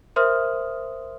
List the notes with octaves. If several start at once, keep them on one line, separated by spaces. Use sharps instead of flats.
A#4 C5 E5 C6 D#6 F6